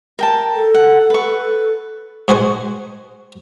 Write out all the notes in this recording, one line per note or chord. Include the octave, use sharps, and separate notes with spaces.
A#4 G5 A5
A4
F#5
B4 C#6
G#2 F#4 C5 G#5 C#6